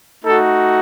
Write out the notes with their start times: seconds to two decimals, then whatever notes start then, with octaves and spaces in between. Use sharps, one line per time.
0.24 A3 D#4 F#4 A4